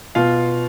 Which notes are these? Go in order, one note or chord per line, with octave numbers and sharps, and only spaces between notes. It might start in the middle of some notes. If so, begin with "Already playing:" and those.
B2 F4 F5